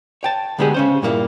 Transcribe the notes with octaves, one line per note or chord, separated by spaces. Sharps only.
C#5 G5 A5
D2 D3 G#3 B3 G4 G#4
C#3 C#4 C5
G2 A#2 A#3 E4